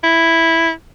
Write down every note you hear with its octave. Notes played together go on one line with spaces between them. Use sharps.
E4